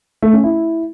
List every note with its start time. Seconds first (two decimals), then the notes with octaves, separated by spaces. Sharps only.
0.22 A3
0.33 C#4
0.44 E4